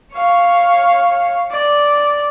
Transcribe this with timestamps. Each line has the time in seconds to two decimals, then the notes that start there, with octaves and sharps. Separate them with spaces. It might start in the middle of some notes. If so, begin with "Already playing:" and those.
0.14 C#5 F5
1.51 D5